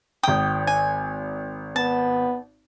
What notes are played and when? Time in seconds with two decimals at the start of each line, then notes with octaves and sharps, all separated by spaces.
0.23 G#1 G5 D#6 G6
0.67 G#5
1.76 B3 A5